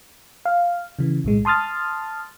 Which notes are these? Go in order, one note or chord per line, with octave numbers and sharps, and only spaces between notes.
F5
C#3 E3
B1 A2 G#3
A5 C6 D#6 F6 A6